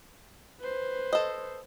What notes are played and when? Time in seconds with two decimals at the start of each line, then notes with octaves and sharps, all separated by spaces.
0.61 B4 C5
1.13 A4 D#5